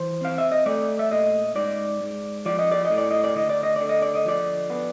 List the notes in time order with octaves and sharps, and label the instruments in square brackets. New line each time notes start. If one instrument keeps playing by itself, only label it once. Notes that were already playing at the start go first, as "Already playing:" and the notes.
Already playing: [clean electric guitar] E3 C5
C4 F5
E5
D#5
A3 D5
E5
A#2 D#5
G#2 D5
G#2
F3 D5
D#5
D5
D#5
A2
D5
D#5
D5
D2 D#5
D5
D#5
D3 D5
D#5
D5
D#5
F3 D5
B3